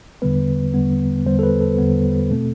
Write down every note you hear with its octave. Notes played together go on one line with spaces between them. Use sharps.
E2 D3 G3 B3 B4
E2 D3 G3 B3
E2 D3 G3 B3 C5
A4
B4
A4
E2 D3 G3 B3
B2 A3 C4